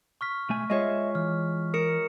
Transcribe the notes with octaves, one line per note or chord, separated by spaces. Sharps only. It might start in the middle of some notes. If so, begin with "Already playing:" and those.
C#6 F6 B6
B1 A3 G#5
G#3 F4 C#5 D#5 E5
E3 F6
A#4 D#6 C#7 E7